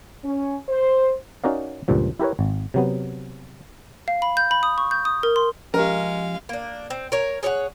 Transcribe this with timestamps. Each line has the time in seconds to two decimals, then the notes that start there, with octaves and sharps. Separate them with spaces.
0.24 C#4
0.68 C5
1.44 C#4 D#4 F#4 A#4 D5 F5
1.88 C#2 G2 A#2 F3
2.20 E4 G4 A#4 B4 C#5
2.39 G#1
2.74 C3 F#3 B3
4.08 F5
4.22 B5
4.37 G6
4.51 B5
4.63 D#6
4.78 C#6
4.91 G6
5.05 D#6
5.23 A#4
5.36 C6
5.74 F3 G#3 C#4 G4 A#4 F5
6.49 A#3 D4
6.90 C4
7.12 A#4 C#5
7.43 G#4 C#5 D5 F#5